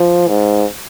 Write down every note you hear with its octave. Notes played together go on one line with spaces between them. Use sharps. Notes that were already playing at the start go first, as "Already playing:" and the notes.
Already playing: F3
G#2